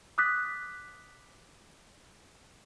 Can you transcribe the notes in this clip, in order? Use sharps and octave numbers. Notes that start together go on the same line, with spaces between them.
D6 D#6 F#6 A6 B6